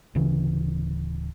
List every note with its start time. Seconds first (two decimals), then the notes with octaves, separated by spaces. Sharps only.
0.15 D1 C#3 E3